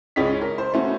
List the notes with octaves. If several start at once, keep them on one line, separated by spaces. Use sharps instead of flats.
C#2 G#3 C#4 D5 D#5 B6
A#4
C5
A3 B3 C#4 F#4